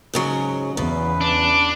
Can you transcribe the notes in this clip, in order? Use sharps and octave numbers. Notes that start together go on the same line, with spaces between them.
G#2 C#3 F#3
E2 C#3 B4
D4